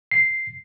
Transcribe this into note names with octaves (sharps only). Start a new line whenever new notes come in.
C7